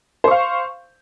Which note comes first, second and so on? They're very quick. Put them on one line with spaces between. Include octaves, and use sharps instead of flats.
C5 C#6 F5